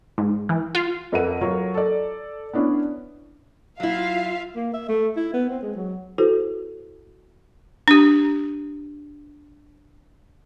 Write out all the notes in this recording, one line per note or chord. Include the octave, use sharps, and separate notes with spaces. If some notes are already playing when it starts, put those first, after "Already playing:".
G#2
E3
F4
F2 A#4 B4 E5 F#5 D#7
F#3 F4 A#4 C#5
A4 D5
B3 C#4 D4 E4
F#3 E4 F4 E5 F5
A#3
E5
A3
E4
B3
C4
G#3
F#3
E4 F#4 A4 B4 C5
D4 G4